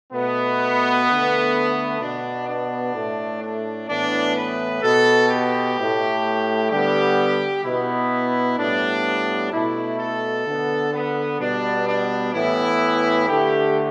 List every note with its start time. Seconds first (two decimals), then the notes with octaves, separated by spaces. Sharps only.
0.13 B2 A3 B3
1.07 D3 A3
2.01 B2 B3 D4
2.48 D4
2.95 A2 A3
3.42 D4
3.89 A2 E3 B3 D4
4.36 B4
4.83 B2 B3 A4
5.29 G4
5.77 A2 A3
6.70 D3 G3 B3 G4
7.64 B2 B3 E4
8.58 A2 G3 B3 D4
9.52 B2 A3 E4
9.99 A4
10.47 D3 B3
10.93 B3
11.40 B2 G3 B3 D4
11.88 D4
12.33 A2 E3 B3 E4
13.28 D3 A3 G4